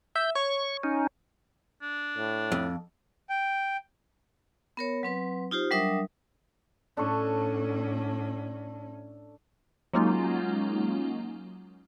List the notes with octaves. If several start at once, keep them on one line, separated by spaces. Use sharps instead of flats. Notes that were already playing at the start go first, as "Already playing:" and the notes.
E5 G6
C#5 C#6
C#4 D#4
D4
A2
F2
G5
B3 A#4 C#5
F#3 C4 B4
D#4 F4 G4 C5
F#3 G3 D4 A#4 E5 D#6
A2 C#4 D4 A4 C#6
F#3 G#3 A#3 C#4 D#4 F4